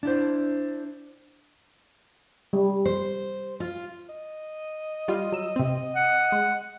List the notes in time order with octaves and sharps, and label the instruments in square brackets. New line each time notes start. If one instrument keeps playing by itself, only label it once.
[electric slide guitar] D4 E4 C5
[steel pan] G3
[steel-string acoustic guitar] C5
F4
[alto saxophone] D#5
[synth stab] G3 F4
F#3 E6
C3 C4
[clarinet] F#5
[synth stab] G#3